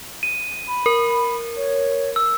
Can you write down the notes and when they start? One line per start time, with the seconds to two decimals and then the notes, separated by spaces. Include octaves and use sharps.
0.23 D#7
0.67 B5
0.86 A#4
1.56 C#5
2.16 E6